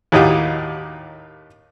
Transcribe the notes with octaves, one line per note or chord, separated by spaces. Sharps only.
D#2 A2 D#4 F#4 G4 F5